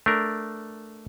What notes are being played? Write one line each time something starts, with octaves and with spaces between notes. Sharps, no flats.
A3 D4 A#4